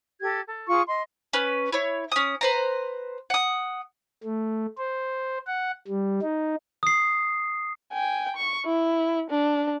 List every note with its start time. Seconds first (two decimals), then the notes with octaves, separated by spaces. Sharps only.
0.21 G4 A4 G#6
0.47 A4
0.68 F4 G#4 C#6
0.87 D#5 C6
1.33 C#4 B4
1.72 E4 C#5
2.12 C#4 D#6
2.41 B4 C5 A#5
3.30 F#5 D#6
4.24 A3
4.78 C5
5.47 F#5
5.87 G3
6.22 D#4
6.83 D#6 C7
7.92 G5 G#5
8.36 C#6
8.66 E4
9.31 D4